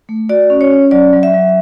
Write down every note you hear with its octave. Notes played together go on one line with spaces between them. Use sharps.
A3
F#4 D5
C#4
C#5
C#4
F#3 D5
F#3
E5
F#3